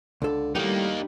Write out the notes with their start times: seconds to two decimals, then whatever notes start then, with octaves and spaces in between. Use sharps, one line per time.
0.22 C#2 D3 A4
0.55 A2 G3 A#3 D#4 G4 A#4 F#5